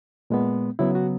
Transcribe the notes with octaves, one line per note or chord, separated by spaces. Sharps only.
A#2 G#3 B3
C#3 F#3 B3 E4
F#4